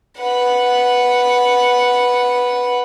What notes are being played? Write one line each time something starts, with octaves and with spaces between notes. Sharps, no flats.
B4 F#5